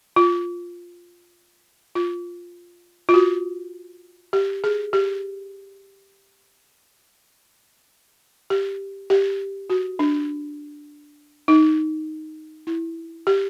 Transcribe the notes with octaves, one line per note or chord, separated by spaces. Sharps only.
F4
F4
F4
F#4
G4
G#4
G4
G4
G4
F#4
D4
D#4
E4
G4